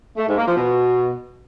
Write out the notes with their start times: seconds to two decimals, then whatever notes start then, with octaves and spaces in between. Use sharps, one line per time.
0.17 A3
0.27 G#2
0.36 A#3
0.46 F3
0.56 B2